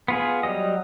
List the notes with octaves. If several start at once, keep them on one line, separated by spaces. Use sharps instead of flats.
B3 F4 G#4
F#3 G3 D#5